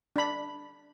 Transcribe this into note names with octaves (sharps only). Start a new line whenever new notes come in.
D4 B5